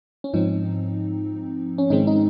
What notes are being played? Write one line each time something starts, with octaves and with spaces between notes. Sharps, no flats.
C#4
G#2 F3 C4 D#4
C#4
G#2 D#3 G#3 C4 D#4
D#4